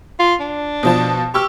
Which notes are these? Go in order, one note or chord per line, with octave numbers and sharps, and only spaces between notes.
F4
D4
B2 F3 A5
G4 C#6 E6 F6